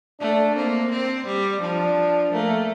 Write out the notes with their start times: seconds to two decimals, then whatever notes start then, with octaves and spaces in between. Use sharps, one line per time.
0.20 A3 D4
0.56 A#3 C4
0.91 C4
1.26 G3
1.62 F3 D4
2.32 A3 A#3